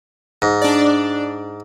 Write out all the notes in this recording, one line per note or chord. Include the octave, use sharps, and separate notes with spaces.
G#2
D4 D5